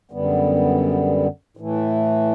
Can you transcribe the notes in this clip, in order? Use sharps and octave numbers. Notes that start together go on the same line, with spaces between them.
F#2 D3 G3 B3
A2 E3 A3